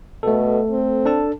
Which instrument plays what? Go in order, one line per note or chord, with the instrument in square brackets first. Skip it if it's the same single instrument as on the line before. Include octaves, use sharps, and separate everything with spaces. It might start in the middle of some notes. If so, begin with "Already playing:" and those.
[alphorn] B2 [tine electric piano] A3 A4
[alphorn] C4
[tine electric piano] D4 A4 A5